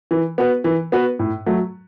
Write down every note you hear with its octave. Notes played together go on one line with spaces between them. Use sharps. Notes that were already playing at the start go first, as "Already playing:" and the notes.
E3
B3 F#4 B4
E3
B3 F#4 B4
A2
F#3 A3